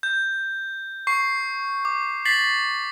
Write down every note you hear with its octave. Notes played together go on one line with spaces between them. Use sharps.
G6
C#6 C7
D6
A6 B6 C7 F#7